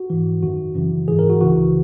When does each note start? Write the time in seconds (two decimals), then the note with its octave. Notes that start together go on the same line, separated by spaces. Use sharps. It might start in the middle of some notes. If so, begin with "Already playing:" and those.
Already playing: F#4
0.10 G#2 E3
0.43 F#2 D#3 F#4
0.75 F#2 C#3 E3
1.08 G#2 E3 G#4
1.19 A#4
1.30 F#4
1.41 C#2 C#3 E3 F#4